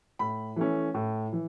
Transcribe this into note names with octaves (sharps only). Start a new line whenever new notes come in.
A2 B5
E3 A3 C#4
A2
E3